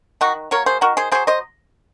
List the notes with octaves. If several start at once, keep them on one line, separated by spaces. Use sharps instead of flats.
D#3 D#4 F#4
F#3 A#3 A#4 C#5
G#4 C5
D#3 F#4 A#4
G#4 C5
F#3 A#3 G#4 C5
C5 D#5